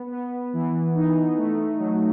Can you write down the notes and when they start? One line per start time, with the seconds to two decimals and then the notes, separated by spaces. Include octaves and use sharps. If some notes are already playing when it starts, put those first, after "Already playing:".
Already playing: B3
0.11 B3
0.53 E3
0.95 D#4
1.37 A3
1.79 F#3